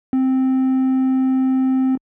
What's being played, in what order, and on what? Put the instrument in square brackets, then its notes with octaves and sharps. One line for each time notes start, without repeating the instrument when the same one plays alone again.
[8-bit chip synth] C4